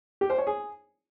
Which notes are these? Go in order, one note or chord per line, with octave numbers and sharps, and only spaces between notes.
G4
C5
C#5
G#4